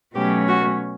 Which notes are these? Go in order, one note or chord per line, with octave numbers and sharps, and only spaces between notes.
B2 F#3 A3 C#4 G4
F#4